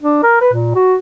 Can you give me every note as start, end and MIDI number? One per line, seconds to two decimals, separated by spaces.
0.02 0.19 62
0.23 0.39 70
0.41 0.50 71
0.53 0.71 46
0.75 0.95 66